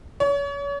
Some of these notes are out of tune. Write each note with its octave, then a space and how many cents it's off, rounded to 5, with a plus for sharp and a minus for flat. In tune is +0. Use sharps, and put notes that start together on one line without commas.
C#5 +35